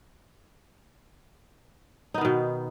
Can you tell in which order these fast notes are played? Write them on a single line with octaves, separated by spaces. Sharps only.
D#4 B3 D#3 B2